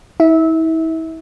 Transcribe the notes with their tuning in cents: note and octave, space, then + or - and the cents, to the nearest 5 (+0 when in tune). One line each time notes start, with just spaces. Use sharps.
E4 -40 E5 -20